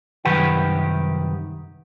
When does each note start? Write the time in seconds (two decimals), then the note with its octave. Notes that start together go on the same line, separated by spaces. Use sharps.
0.25 C2 F#2 D#3 G4 B4 F#5